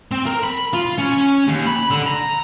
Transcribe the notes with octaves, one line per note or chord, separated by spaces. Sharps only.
C4
A#4
B5
F4
C#4
D#2
B5
D3
A#5